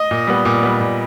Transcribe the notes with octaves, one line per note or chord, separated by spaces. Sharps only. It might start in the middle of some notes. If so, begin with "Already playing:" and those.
Already playing: D#5
A#2
G3 B3
A#2
G3 B3
A#2